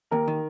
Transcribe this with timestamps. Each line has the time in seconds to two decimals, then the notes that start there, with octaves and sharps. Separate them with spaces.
0.11 D#2 A#4
0.28 D#3